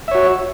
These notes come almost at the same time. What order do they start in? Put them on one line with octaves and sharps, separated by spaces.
E5 C#5 F#4